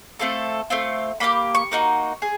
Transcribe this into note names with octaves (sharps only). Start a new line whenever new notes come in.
A3 C4 F4 A4
A3 C4 F4
A#3 D4 G4 B5
C#6
A#3 D#4 F#4
G#4